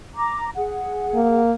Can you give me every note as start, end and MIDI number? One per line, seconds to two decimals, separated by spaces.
0.16 0.48 82
0.16 0.48 86
0.56 1.41 68
0.56 1.41 78
1.14 1.53 58